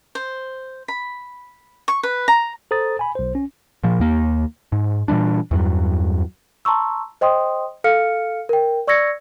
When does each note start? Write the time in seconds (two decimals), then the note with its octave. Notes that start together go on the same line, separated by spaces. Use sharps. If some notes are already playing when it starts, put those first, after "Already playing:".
0.15 C5
0.88 B5
1.88 C#6
2.03 B4
2.28 A#5
2.71 A4 C5 A#5 D#6 A6
2.99 G#5 B5
3.15 B1 C5
3.35 C#4
3.84 A#2 F3
4.00 D#2 A#3
4.72 G#2
5.08 A#2 E3 G3 D4
5.51 E2 G2 F#3
6.65 A5 A#5 C6 C#6 E6
7.21 C5 D#5 G5 C6 D#6
7.84 A4 F5 F6 C#7
8.49 A#4 G5
8.87 D5 C#6 E6 G#6 A#6 C#7